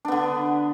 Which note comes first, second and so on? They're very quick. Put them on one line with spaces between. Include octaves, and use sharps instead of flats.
D4 B3 D3